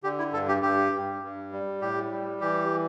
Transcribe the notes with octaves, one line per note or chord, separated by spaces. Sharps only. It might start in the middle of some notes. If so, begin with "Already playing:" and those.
D3 G4
E4
G2 A4
G4
G2 G4
G2
G2
G3
A2 G4
G3
E3 G4